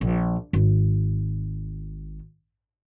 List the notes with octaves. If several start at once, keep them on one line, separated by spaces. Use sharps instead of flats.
A#1
G#1